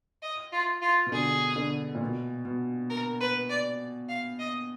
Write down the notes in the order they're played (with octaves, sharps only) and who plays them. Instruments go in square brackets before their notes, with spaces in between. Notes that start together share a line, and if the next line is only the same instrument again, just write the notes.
[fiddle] D#5
F4
F4
[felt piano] B2
[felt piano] D3 [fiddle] G#4
[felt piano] D3
A#2
B2
B2
[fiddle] A#4
B4
D5
F5
D#5